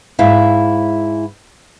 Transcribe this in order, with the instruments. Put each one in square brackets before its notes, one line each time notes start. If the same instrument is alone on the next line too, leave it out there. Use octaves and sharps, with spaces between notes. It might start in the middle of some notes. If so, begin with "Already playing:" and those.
[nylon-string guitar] G#2 E4 E5 F5